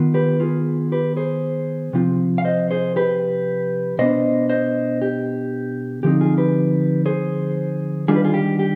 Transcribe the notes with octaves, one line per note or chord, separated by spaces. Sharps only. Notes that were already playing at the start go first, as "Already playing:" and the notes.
Already playing: D#3 B3 F4
G4 B4
F4 G#4
G4 B4
G#4 C5
C3 F3 C4 F4
F5
C5 D#5
G#4 C5
G4 B4
B2 B3 D4 C5 D#5
C5 D#5
G4
D3 F3 C4 D#4 G4
F4 G#4
G4 B4
G#4 C5
D#3 G3 D4 F4 G#4
B4
F4 G#4
G4
G4